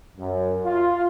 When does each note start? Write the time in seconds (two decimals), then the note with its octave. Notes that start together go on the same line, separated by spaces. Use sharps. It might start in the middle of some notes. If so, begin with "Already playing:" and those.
0.17 F#2
0.64 F4